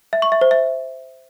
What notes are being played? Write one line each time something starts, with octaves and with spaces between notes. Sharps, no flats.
E5
C#6
E5
C5
E5